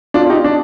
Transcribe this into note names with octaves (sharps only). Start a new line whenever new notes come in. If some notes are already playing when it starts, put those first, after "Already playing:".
D4 F4
F4
D#4 G4
D4